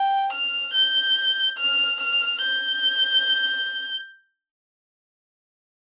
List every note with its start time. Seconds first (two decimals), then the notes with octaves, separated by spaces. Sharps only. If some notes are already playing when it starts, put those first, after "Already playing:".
Already playing: G5
0.32 F6
0.74 G6
1.58 F6
2.00 F6
2.41 G6